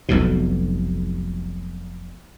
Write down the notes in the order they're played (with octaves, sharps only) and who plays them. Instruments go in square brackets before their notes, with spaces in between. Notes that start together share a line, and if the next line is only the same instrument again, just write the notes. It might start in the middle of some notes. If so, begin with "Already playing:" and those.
[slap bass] F1 B1 F2 B2